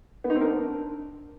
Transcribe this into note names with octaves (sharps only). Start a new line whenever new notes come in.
B3
D#4
C4
A#4
D4